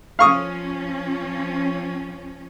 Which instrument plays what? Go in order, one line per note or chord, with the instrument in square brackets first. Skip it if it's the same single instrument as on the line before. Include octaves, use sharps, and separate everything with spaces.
[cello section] F3 C#4 [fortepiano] F5 C#6 D#6